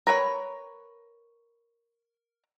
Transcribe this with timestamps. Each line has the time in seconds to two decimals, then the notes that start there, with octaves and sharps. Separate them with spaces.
0.07 A#4 B4 C#5 B5